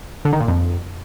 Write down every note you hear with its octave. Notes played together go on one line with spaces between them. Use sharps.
D3
D#3
A#2
F2